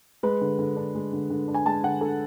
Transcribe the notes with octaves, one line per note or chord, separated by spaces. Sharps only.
G#3 B4
D3
D3
D4
G#3
D3
D3
D4
G#5
G#3 A5
D3 F#5
D3 A4